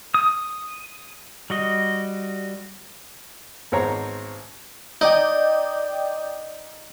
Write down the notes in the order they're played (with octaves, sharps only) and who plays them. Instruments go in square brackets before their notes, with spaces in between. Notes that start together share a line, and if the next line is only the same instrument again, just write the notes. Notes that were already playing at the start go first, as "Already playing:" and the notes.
[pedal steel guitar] D#6
G3 F#4 D#5
[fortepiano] G#1 B3 C5 C#5 A#5
[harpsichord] D#4 [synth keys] D5 D#5 G5